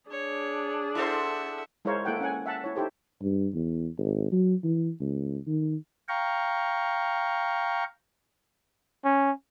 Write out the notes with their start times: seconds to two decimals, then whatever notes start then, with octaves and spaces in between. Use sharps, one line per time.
0.11 D4 G#4 C#5
0.95 E4 A4 C5 E5 F#5
1.85 G#3 E4 A#4 C5 C#5 F5
2.05 A#3 E4 A4 F#5 G5
2.20 C#4 F#5 G#5
2.46 E5 F#5 A5
2.64 E4 C#5
2.76 D#4 E4 G4 A4 C5
3.22 G2
3.54 E2
3.98 G#1
4.32 F#3
4.63 E3
5.00 C#2
5.46 D#3
6.09 F5 G5 A#5 C#6
9.04 C#4